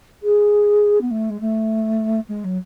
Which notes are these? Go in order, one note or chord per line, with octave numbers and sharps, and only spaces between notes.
G#4
B3
A3
G#3
A3
G#3
F#3